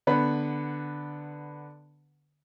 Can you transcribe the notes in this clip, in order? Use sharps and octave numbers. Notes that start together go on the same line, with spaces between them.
D3 B3 B4